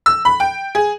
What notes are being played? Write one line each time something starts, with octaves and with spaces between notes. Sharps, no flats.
E6
B5
G5
G#4